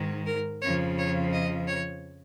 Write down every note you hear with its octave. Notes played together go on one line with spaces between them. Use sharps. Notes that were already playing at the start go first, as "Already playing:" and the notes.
Already playing: G#2 D#3
A#4
F2 C#3 F3 C#5
C#5
D#5
C#5